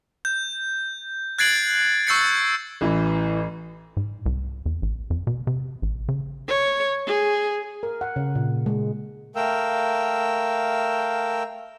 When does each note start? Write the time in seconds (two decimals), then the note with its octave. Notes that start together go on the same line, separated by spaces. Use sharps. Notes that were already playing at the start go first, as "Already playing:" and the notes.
0.25 G6
1.39 F#6 G#6 A6 C7 D7 F#7
2.07 C#6 E6 G6 A6 C7 C#7
2.81 A1 E3
3.97 G#2
4.26 C2
4.66 E2
4.82 A1
5.10 F2
5.27 B2
5.47 C3
5.82 A1
6.08 C#3
6.48 C#5
7.07 G#4
7.83 A#4
8.01 F#5
8.16 C#3
8.35 A#2
8.66 G#3
9.36 A3 A#4 F5 G5 E6